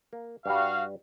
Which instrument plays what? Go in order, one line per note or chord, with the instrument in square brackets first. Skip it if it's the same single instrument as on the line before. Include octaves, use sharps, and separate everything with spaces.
[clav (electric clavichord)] A#3
[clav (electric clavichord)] G2 G3 [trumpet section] F#4 F5